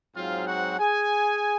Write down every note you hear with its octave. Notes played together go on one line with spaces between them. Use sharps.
G#2 F#3 C4 F4 F5
F#4 F#5
G#4 G#5